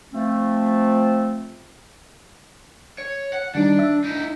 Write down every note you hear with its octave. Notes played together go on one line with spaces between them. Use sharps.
F3 A3 C4
C#5
F#5
D#3 G3 D4 D#4
E5
D#4 E4